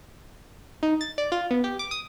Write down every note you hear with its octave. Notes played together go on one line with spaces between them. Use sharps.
D#4
A6
D5
F4
B3
G4
D6
D#6